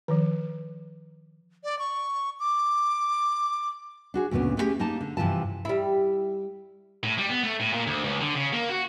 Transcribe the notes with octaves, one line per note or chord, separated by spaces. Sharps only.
D#3 F3
D5
C#6
D6
D4 F#4 G#4
D2 A#2 C#3 B3 D4
A3 B3 C#4 D4 G4 G#4
A#3 D#4 G4 A5
D3
G2 C3 E3 F3 F4 A5
G3 E4
A2
G3
B3
A3
A2
A#2
D2
C#2
D3
C#3
A#3
F#4